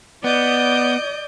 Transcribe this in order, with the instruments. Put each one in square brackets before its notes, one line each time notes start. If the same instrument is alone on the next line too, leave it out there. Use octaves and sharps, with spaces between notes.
[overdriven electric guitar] B3 [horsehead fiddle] D5 [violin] D#5 G6